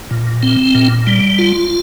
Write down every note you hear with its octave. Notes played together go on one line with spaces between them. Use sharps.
A#2
C4
A#2
G3
F4